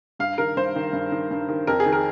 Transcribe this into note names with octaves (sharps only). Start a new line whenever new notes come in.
G2 F5
D#3 A#4
G2 C5
D#3
G2
D#3
G2
D#3
F2 A#4
G#4
D#3
A#4